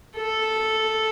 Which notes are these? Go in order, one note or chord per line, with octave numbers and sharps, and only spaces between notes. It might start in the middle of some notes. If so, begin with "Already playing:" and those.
A4